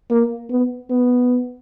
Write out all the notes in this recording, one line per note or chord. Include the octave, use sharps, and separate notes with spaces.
A#3
B3
B3